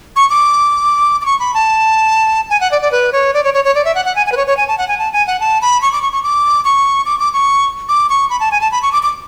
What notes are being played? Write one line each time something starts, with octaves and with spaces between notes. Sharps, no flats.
C#6
D6
D6
C#6
B5
A5
G#5
F#5
D5
D5
B4
C#5
D5
C#5
C#5
C#5
D5
E5
F#5
F#5
G#5
G#5
B4
C#5
C#5
G#5
A5
F#5
G#5
A5
G#5
F#5
A5
B5
C#6
D6
C#6
C#6
D6
C#6
D6
D6
C#6
D6
C#6
B5
A5
G#5
A5
B5
C#6
D6
D6